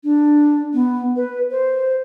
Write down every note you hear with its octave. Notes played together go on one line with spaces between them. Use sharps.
D4
B3
B4
C5